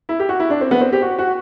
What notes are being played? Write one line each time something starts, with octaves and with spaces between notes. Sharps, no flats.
E4
G4
F#4
E4
D4
C4
B3
C4
G4
F#4
F#4